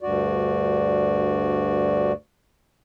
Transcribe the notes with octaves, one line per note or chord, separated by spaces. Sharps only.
D2 G2 F#4 D5